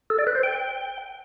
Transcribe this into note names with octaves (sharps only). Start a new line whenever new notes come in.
A4
D5
B4
C5
G5